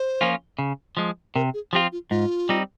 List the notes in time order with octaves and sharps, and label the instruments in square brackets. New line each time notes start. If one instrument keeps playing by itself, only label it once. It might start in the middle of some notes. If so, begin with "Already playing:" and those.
Already playing: [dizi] C5
[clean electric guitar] F3 A#3 C#4 F4
C#3
F3 G#3
[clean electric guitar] C3 [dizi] A#4
[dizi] G#4
[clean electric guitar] F3 C4 F4 [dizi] G4
[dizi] F4
[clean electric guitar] G#2 [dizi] F4
[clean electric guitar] G3 C4 D#4